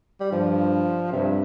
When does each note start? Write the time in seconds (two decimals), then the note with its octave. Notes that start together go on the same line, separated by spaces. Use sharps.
0.20 G3
0.32 G2 F3
1.12 G2 C3